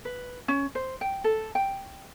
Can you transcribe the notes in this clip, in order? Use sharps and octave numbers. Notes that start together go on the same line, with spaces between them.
B4
C#4
C5
G5
A4
G5